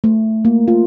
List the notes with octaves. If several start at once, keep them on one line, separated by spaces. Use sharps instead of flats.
A3
A#3
F4